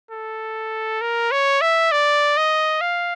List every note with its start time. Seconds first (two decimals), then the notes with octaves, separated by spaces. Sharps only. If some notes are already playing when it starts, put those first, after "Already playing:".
0.11 A4
1.01 A#4
1.32 C#5
1.61 E5
1.92 D5
2.37 D#5
2.81 F5